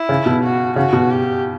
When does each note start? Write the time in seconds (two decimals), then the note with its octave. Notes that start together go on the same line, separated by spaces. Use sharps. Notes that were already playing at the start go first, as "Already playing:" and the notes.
Already playing: E4
0.09 C#3
0.26 B2
0.43 F#4
0.76 C#3 F#4
0.93 B2
1.10 G4